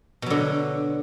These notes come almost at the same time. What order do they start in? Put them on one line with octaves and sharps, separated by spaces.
B2 F#3 D3